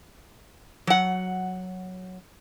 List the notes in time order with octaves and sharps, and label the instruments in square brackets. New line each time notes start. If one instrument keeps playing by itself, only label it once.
[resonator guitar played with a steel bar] F#3 F#5